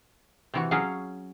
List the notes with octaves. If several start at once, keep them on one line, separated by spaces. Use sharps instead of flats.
C3 E3 F#4
F#3 C#4 F#4 G#4 F5